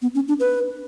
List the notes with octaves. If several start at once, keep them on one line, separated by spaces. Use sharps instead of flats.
B3
C#4
D4
B4